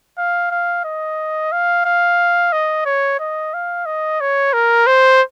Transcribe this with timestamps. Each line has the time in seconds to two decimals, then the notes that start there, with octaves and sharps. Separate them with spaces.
0.18 F5
0.51 F5
0.85 D#5
1.52 F5
1.85 F5
2.52 D#5
2.86 C#5
3.20 D#5
3.54 F5
3.86 D#5
4.21 C#5
4.53 A#4
4.87 C5